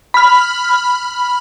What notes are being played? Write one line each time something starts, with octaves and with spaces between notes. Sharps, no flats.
B5 F6